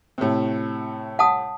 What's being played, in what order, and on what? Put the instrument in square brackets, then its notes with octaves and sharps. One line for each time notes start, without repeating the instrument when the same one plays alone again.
[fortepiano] A2 C3
[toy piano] F#5 A5 D#6